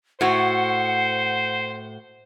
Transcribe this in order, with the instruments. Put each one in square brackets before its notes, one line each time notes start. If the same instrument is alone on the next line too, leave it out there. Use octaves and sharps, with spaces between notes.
[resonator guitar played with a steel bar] A2 F#4 [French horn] C5 [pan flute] F#5